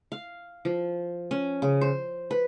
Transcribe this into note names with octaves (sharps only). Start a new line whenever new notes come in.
F5
F3
C#4
C#3
C5
B4